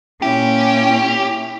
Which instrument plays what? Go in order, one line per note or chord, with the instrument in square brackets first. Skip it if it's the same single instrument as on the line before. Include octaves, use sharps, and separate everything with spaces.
[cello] A#2 C#4 [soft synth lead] E4 [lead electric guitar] G4